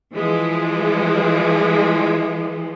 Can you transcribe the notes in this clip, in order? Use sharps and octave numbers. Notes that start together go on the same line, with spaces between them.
E3 F3 G#3